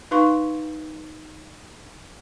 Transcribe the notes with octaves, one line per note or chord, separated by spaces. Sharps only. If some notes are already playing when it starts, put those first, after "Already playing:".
D#4 B4 F5 C6 C#6